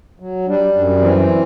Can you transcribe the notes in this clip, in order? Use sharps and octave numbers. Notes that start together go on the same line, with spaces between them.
F#3
G3 D4
F#2 D4
E3 C4